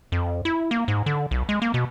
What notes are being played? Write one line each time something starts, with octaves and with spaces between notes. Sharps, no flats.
F2
E4
A#3
G#2
D3
B1
G#3
A#3
B2